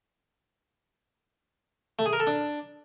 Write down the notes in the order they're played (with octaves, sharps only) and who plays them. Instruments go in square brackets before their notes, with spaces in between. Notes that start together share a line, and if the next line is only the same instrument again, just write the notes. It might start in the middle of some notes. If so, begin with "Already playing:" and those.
[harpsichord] A3
G#4
A#4
A4
D4